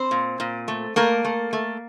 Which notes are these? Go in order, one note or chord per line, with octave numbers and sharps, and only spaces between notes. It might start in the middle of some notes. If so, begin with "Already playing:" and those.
Already playing: C4 C5
A#2
A#2
A3
A3 A#3 A#4
A3
A3